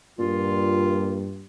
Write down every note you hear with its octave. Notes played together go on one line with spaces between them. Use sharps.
G2 A#2 F4